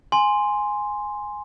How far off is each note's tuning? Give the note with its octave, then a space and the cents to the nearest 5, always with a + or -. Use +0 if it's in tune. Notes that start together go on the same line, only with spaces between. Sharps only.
G#5 +0 C6 +0